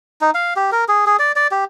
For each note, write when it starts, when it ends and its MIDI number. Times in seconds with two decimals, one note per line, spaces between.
0.21 0.31 63
0.35 0.54 77
0.56 0.70 67
0.72 0.84 70
0.88 1.05 68
1.06 1.17 68
1.19 1.32 74
1.36 1.47 74
1.51 1.64 67